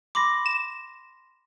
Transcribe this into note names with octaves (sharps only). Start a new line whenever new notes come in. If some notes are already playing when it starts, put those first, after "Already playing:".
B5 C6 D6 A#6
E7